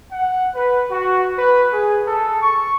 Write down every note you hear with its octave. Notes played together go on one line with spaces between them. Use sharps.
F#5
B4
F#4
B4
G#4
A4
C#6